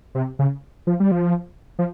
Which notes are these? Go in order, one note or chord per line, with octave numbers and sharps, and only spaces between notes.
C3
C#3
F3
G3
F3
F3